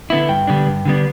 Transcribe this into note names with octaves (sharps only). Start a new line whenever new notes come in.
D3 B3 E4
G2 G5
D3 G3 B3 D4
G2
D3 G3 B3 D4